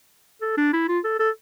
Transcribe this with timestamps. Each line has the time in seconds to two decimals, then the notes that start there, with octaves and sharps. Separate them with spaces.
0.42 A4
0.57 D4
0.73 E4
0.88 F4
1.04 A4
1.19 A4